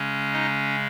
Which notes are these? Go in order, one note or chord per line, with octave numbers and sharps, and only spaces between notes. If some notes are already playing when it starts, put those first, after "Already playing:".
Already playing: C#3 G#3 C#4
D#4 D#5